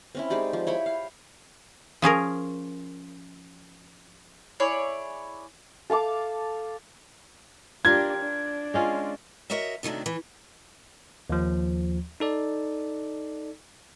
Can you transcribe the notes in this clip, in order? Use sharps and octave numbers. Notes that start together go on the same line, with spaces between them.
C4 C#4 E4
G#3 D#4 G4 D5
F3
E4 C#5 G5 B5
F5
F3 C#4 G#4 A#4
E4 G#4 C#5 D5
A4 F5 A5 D6
D4 F4 G4 A#4 G#6
D4
G#3 C#4 F4
F#4 A#4 C#5 D#5 E5
C3 D#3 F#3 A3 D4
E3
D#2 F3
D#4 A4 D5